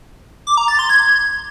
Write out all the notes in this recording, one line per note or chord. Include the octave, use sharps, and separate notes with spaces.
D6
A#5
A6
C6
G#6